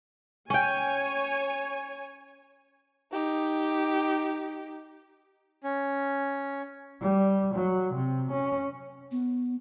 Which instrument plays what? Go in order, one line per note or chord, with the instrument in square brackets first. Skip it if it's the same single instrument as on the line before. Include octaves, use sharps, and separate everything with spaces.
[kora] C#4 G5 [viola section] C#5 G#5
[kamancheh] D#4 G4
[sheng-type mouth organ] C#4
[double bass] G3
F#3
C3
C#4
[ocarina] B3